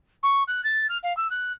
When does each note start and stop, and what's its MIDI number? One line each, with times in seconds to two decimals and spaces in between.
0.23 0.43 85
0.47 0.63 90
0.64 0.86 93
0.89 0.98 89
1.03 1.15 77
1.17 1.27 88
1.30 1.52 90